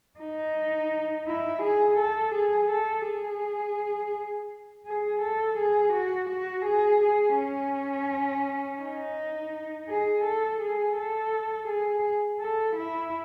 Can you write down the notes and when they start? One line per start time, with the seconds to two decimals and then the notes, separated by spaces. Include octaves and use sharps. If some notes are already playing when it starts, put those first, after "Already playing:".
0.20 D#4
1.27 E4
1.63 G#4
1.99 A4
2.35 G#4
2.71 A4
3.06 G#4
4.86 G#4
5.22 A4
5.58 G#4
5.94 F#4
6.30 F#4
6.66 G#4
7.02 G#4
7.37 C#4
8.81 D#4
9.89 G#4
10.25 A4
10.61 G#4
10.97 A4
11.68 G#4
12.40 A4
12.76 E4